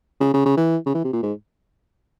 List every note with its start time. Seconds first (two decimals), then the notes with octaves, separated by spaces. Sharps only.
0.20 C#3
0.34 C#3
0.46 C#3
0.57 E3
0.86 C#3
0.94 E3
1.04 C3
1.13 A#2
1.23 G#2